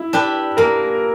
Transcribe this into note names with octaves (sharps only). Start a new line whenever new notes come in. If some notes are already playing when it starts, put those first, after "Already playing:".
Already playing: E4
D4 G4 B4
A#3 A#4 A#5